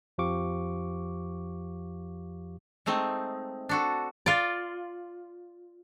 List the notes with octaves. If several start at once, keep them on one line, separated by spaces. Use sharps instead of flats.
F2 F3 G4 F5 C#6 D6
G#3 A3 C4 D#4
D4 F#4 A4
F4 D5